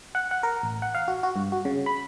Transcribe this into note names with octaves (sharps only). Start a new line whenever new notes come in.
F#5
F#5
A#4
A1
F#5
F5
F#4
F#4
G2
F#4
C#3
B5